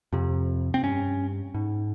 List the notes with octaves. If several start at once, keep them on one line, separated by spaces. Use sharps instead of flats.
F2 C3
C4
G2 C#4
G#2